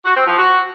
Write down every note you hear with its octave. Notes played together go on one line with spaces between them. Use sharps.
F#4
C4
F3
F#4